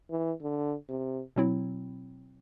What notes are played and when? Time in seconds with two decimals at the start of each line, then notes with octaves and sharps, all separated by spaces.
0.10 E3
0.42 D3
0.89 C3
1.36 B2 F#3 C4 E4